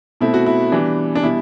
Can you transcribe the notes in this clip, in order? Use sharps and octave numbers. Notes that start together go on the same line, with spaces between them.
B2 A3 C4 E4
F#4
E4
E3 G3 B3 D4
D4
B2 G3 E4